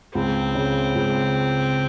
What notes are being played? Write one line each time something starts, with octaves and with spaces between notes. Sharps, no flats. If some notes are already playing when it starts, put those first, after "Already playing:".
C#2 C4
C#3
C#2